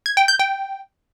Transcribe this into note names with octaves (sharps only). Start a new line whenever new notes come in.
G#6
G5
G6
G5